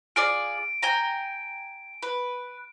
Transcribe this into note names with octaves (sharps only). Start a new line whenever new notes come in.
F4 G#4 D5 D7
G5 G#5 A#5
B4